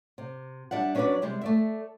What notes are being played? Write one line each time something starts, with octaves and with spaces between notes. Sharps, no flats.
C3
G3 D4 E5 F#5
F#3 C#4 D4 B4 C#5 D5
C3 G3 G#3
A3 D5 E5